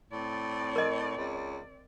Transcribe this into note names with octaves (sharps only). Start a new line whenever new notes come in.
A2 C4 D5
A#4 D#5
C#2